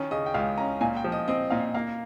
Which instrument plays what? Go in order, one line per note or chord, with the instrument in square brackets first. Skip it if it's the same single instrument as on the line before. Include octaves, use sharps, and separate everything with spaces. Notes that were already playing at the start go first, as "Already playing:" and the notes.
Already playing: [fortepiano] D#3 C#4
[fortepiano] C#3 [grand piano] D#5
[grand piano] G5
[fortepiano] C#2 [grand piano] F5
[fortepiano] C#4 [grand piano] A#5
[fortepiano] A#2 [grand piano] G#5
[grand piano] G5
[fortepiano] F3
[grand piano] D#5
[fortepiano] C4 [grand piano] D#5
[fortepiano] A#2 [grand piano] F5
[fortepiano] A#3 [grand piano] F5